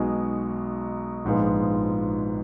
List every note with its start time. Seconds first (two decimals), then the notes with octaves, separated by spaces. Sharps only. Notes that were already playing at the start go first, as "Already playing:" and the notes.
Already playing: B1 B2 G#3 D#4 G#4
1.25 A#1 G#2 F3 G#3 B3